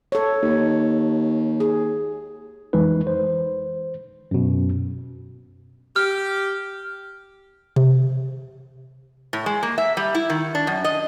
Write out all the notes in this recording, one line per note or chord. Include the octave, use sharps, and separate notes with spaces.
A4 C#5
D#2
G#4
F2 E3 G#3 D#4 B4
C5
F#2 B2
G4 F6
C3
A2
G#3
A#3
E5
G3
E4
D#3
D4
F#2
D#5